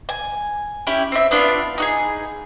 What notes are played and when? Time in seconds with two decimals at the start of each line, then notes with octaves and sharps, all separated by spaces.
0.09 G#5
0.87 C#4 E4 G4
1.12 C4 E5
1.31 B3 D4 E4 F4
1.78 D#4 F#4 G#4